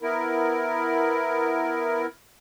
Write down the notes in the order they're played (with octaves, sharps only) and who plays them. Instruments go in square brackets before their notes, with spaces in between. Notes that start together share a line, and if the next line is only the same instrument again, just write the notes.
[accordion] B3 E4 A#4